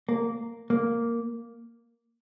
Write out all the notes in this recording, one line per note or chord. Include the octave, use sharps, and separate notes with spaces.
A#3
A#3